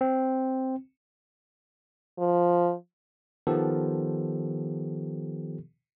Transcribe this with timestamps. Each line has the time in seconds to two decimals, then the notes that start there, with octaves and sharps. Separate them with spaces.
0.01 C4
2.19 F3
3.47 D#3 F3 B3 G4 A4